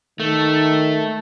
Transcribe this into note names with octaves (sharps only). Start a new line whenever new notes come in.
D#3 A3